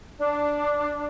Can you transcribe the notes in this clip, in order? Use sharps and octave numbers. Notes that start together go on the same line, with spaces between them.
D4